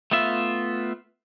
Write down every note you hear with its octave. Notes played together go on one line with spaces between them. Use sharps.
A3 B3 F4 E5